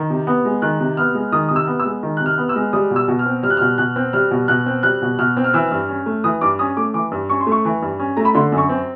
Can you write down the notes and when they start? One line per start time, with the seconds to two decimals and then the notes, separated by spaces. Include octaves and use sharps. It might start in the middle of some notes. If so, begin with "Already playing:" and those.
Already playing: D#3
0.10 C3
0.27 B3
0.45 G#3
0.62 D#3 F#6
0.80 C3
0.97 B3 F6
1.15 G#3
1.32 D#3 D#6
1.49 C3 D#6
1.56 E6
1.67 B3
1.80 E6
1.85 G#3
2.03 D#3
2.17 C3 F#6
2.26 F6
2.38 B3
2.49 E6
2.56 G#3
2.73 G3 D#6
2.90 B2
2.96 E6
3.08 B2
3.19 F6
3.26 C4
3.43 G3 F6
3.50 F#6
3.57 F6
3.61 B2
3.78 B2 F#6
3.96 C4
4.13 G3 F6
4.31 B2
4.48 B2 F#6
4.66 C4
4.83 G3 F#6
5.02 B2
5.18 B2 F6
5.37 C4
5.44 F6
5.54 E3 E6
5.71 G2
5.89 C#4
6.06 A3
6.24 E3 D#6
6.41 G2 D6
6.59 C#4 D#6
6.77 A3 D6
6.94 E3 D6
7.11 G2
7.29 C#4 C#6
7.41 C6
7.47 A3
7.52 C#6
7.65 E3
7.82 G2
7.99 C#4
8.17 A3 A#5
8.25 B5
8.35 D3 C6
8.52 F#2
8.58 C#6
8.69 C4